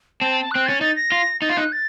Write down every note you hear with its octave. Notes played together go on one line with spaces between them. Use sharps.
C4 A5
A5
A5
C4 F#6
C#4 A6
D#4 A6
A#6
F4
D#4 A6
F4
D#4 F#6
A6